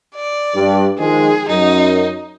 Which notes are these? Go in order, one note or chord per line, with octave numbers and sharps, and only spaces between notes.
D5
G2
D#3 F3 G#3 G#4
F#2 D#4